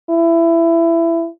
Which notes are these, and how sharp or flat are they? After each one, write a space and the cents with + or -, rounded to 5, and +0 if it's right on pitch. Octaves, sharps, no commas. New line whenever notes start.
E4 +20